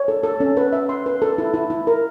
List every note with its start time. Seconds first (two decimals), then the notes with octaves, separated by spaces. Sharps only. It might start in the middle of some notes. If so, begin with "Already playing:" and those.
Already playing: C#5
0.08 A4
0.23 A4
0.40 C#4
0.57 B4
0.73 E5
0.89 C6
1.06 B4
1.22 A4
1.38 E4
1.54 E4
1.70 E4
1.87 A#4